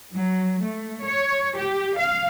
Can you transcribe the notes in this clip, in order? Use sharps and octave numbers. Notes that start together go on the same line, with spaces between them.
F#3
A3
C#5
G4
F5